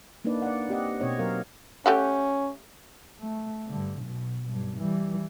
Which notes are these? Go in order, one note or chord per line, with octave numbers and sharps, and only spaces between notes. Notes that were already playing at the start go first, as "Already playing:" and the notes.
A#3 D4 D#4 B4 D5
D5 F#5
C4 G4 D#5 F#5
B2 C4 C#5 D#5
F#3 A#4 F5
A3 C#4 G4 F#5
A3
G2 D3
B1 B2
B1 G2
E3 G3